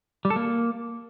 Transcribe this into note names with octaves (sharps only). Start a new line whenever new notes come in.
G3
A4
A#3